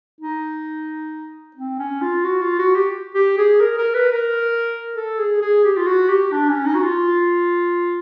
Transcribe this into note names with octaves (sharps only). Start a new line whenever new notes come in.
D#4
C4
C#4
F4
F#4
F4
F#4
G4
G4
G#4
A#4
A#4
B4
A#4
A4
G#4
G#4
G4
F4
F#4
G4
D4
C#4
D#4
F#4
F4